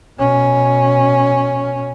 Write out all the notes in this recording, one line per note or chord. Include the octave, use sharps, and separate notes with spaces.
B2 C#4